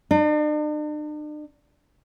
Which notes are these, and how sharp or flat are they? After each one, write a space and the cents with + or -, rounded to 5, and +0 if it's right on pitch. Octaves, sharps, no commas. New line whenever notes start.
D4 +45